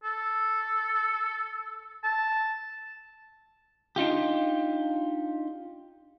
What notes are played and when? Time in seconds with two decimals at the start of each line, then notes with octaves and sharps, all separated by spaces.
0.04 A4
2.03 A5
3.96 D4 D#4 F4 G4